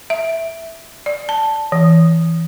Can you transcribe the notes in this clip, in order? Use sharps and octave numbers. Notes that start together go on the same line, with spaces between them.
E5
D5
A5
E3